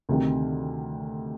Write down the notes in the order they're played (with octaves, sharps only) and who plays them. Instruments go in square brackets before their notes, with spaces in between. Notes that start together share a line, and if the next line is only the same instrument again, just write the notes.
[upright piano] D2 C3 D#3